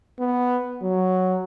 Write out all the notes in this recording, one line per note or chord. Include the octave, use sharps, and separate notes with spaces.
B3
F#3